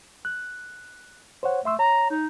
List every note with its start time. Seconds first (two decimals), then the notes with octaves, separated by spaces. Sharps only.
0.25 F#6
1.43 C5 C#5 F#5
1.65 A3 E5 C6 E6
1.79 C#5 A#5
2.10 D#4